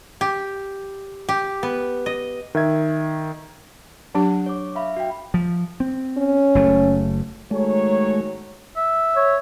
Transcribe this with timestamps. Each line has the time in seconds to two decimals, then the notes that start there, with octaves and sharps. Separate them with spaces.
0.21 G4
1.29 G4
1.63 B3
2.06 D#5
2.55 D#3 E5 G#6
4.15 F#3 D4 G4 F#5
4.46 C#5 D6
4.75 E5 F5 B5
4.96 F#4 F5 G5
5.34 F3
5.80 C4
6.18 C#4
6.55 F#1 A3
7.51 D#3 F#3 G#3 A3 C#5
8.76 E5
9.16 C#5